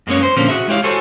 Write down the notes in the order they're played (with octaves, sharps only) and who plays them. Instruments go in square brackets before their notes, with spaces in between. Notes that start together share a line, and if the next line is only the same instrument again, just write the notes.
[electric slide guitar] F#2 G#3 A#3 B3 C#4 C#5
C5
A#2 D3 F3 A#3 C4 C#4
F#4 G#4 E5
G#3 E4 G4 C#5 F5
F#4 A4 C5 C#5 G#5